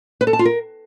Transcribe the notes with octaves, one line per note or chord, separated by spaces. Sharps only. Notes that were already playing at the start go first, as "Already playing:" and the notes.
B4
A4
A5
F4
A#4